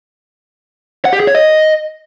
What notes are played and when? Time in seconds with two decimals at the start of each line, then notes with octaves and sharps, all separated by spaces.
1.05 F#5
1.13 G4
1.20 G#4
1.27 C#5
1.35 D#5